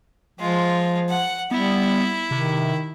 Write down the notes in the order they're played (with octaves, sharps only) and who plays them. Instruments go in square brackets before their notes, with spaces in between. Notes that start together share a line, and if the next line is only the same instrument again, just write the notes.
[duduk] F3 [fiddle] G#3 F4
[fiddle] F#5
[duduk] G3 [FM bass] B3 [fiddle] E4
[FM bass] C3 [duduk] D#3